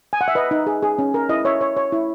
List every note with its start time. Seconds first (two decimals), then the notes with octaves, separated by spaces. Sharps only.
0.13 G#5
0.21 F#5
0.28 E5
0.35 B4 D#5
0.51 D#4
0.67 G#4
0.82 G#4
0.99 C#4
1.14 A#4
1.29 E4 D#5
1.45 C#5 E5
1.61 C#5
1.77 C#5
1.92 E4